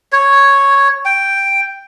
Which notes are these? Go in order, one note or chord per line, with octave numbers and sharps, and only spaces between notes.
C#5
G5